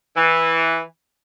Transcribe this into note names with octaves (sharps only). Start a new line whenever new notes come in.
E3